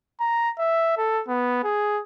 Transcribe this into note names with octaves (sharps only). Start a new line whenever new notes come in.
A#5
E5
A4
B3
G#4